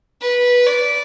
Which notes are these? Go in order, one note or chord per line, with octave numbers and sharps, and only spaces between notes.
B4
D5